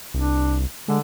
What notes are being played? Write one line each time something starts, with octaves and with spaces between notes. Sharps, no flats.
C2 D4
D3 G#3